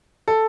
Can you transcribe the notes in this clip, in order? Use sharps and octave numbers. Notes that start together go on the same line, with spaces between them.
A4